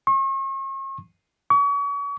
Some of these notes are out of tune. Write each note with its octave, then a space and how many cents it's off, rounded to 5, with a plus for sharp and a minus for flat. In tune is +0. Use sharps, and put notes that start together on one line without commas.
C#6 -40
C#6 +40